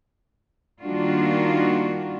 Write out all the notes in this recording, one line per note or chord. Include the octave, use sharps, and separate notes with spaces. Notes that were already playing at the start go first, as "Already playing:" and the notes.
D#3 G3 A#3 D4 F4 F#4